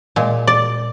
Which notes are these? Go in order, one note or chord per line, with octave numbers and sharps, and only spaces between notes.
A#2 G#3
D5